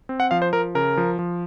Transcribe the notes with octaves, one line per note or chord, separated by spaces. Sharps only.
C4
F#5
F3 F5
C5
F3 A#4
C#3 A#4
F3
F3